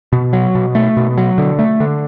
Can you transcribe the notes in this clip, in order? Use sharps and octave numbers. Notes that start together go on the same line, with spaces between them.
B2
F#3
B2
A3
B2
F#3
D3
A3
D3